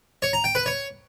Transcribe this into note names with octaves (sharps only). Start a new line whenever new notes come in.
C#5
A#5
G5
B4
C#5